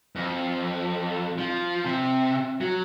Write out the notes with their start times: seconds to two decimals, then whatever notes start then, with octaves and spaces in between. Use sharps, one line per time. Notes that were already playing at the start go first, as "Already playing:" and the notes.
0.16 F2
1.38 F3
1.85 C3
2.61 F#3